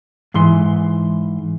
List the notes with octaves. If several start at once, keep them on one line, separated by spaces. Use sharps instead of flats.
G#2 E3 C6